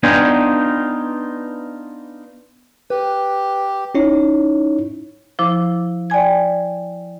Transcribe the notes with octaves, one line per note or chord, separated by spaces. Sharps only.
B3 D4 D#4 F4 G5 G#5
G4 B4
C#4 D#4 E4 C#5
F3 E4 C5 D6
D5 G5 G#5 G#6